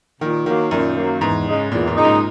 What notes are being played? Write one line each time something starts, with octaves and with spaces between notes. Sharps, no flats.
A#2 D#3
D#3 F#3 A#3
F#2 A#2
F#3 A#3
E2 G#2
C#3 G#3 D#4
E2 A#2
A#2
C#3 G#3 D#4
G#2